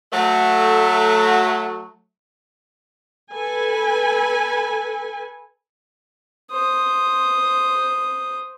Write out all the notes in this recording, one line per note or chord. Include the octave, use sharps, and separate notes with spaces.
F#3 A3
A4 B4 G#5
C5 D#6